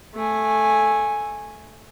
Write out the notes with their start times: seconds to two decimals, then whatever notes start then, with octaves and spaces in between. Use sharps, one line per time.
0.15 A3 G#5